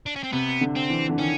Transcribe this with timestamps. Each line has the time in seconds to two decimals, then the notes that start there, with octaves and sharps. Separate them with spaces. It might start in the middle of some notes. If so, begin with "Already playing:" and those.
0.06 D4
0.16 C#4
0.23 C4
0.33 C3 B3
0.61 D3
0.76 C4
0.90 E3
1.09 D3
1.19 D#3 C#4